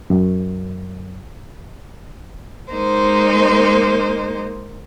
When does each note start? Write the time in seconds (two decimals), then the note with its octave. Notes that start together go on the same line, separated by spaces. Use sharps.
0.10 F#2
2.73 G#3 A#3 D#4 C5